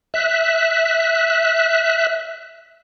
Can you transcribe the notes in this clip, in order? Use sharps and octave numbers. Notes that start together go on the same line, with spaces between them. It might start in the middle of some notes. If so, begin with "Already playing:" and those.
E5 F#6